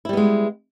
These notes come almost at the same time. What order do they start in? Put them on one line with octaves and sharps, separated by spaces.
E4 G3 B3 G#3